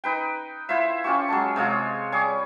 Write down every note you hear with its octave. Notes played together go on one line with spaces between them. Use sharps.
D#4 B4 G5
E4 F4 C5 E5
C#4 F4 G4 C#6
F#3 G#3 A5
C3 G#3 F4 C#5
G3 G#4 C#5